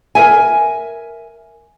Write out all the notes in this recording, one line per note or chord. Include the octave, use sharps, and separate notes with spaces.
A#4 B4 E5 G#5